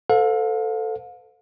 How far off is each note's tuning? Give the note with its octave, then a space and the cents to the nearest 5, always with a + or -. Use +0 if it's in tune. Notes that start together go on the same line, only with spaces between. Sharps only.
A4 +10 C5 -45 F5 +40